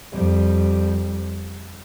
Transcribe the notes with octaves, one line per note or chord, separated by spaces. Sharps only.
F2 G3